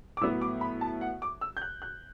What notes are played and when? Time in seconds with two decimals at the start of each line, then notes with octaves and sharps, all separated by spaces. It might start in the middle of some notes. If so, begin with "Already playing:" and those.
0.17 D6
0.21 A2 F#3 B3 E6
0.41 D6
0.61 B5
0.81 A5
1.01 F#5
1.22 D6
1.41 E6
1.57 G6
1.62 F#6
1.82 F#6